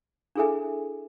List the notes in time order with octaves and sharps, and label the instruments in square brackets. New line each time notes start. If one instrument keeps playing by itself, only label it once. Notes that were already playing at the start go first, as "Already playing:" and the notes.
[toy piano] D4 E4 G#4 A4 E5 G#5